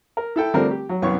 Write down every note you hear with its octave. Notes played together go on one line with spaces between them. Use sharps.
A#4
E4 A4 G5
D3 F3 G3 A3 C4 A#4
G4
F#3
C2 F#2 B3 C#5 C#6